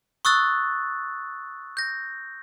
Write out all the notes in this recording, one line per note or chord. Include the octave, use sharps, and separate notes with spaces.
C#6 D#6 E6 F#6 A6
G6 A#6